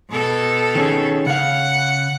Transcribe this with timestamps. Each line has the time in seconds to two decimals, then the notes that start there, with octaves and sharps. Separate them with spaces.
0.11 B2 A4
0.75 D#3 C#4 G#4
1.26 C#3 F5 F#5